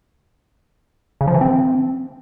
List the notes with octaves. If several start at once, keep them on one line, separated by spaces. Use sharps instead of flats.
C#3
F3
E3
C4